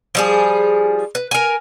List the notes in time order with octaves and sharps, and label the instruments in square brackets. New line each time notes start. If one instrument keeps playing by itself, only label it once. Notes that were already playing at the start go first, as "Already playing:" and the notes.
[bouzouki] F3 G3 G#4
B4
A#4 G#5